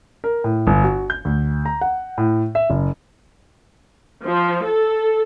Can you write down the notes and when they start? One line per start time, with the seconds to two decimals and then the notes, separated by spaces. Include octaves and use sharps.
0.24 A#4
0.44 A2
0.67 G1
0.83 F#4
1.10 G6
1.25 D2
1.65 A#5
1.81 F#5
2.18 A2
2.55 E5
2.70 F#1
4.24 F3
4.62 A4